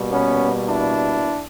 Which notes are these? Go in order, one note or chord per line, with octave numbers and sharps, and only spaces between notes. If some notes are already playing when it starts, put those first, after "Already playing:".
Already playing: B2 G3 A#3
B3 C#4
D4 E4